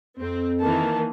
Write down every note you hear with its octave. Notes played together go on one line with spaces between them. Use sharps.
F2 C4
D#3 E3 A#3 A5